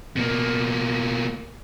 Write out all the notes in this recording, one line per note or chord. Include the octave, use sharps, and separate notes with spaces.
B2 A#3